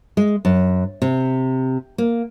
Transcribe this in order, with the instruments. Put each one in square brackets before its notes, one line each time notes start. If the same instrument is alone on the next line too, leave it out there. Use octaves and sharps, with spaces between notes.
[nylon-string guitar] G#3
F#2
C3
A#3